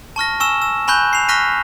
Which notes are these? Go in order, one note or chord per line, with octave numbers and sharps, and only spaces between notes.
A5 C#6 F6 A#6
G#5 C#6 E6 E7
E6
G#5 B5 C#6 F#6 G6
C7 F7
C#6 F6 F#6 A#6 B6 D#7